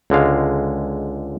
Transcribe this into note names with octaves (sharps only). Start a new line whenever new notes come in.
C#2 D3 G#3 F5